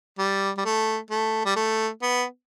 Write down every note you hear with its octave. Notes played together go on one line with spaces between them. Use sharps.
G3
G3
A3
A3
G3
A3
B3